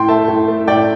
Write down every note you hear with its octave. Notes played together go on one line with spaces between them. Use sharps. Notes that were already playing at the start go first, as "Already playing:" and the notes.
Already playing: A2 G5 C6
A3 E5 A5
A2
A3
A2 D5 G5